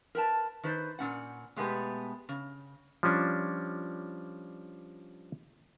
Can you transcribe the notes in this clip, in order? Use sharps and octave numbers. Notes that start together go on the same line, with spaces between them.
A#4 B4 G5 A5
D#3 B4 C5
A#2 C#4 F#5
B2 G#3 A3 B3 G4 B4
C#3
F3 G3 C#4 D4